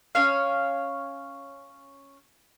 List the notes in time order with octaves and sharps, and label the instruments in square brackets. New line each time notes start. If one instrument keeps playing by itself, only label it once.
[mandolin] C#4 C#5 F5